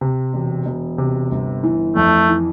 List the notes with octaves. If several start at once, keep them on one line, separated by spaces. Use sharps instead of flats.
C3
E1
E1
C3
G1
E3
F2 A3
E3